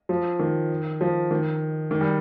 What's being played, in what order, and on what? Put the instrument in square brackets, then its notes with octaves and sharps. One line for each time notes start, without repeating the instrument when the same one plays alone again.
[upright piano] F3
D#3
F3
D#3
D#3
G3